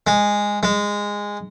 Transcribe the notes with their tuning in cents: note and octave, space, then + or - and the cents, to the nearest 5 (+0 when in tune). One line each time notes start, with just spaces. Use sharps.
G#3 -10
G#3 -15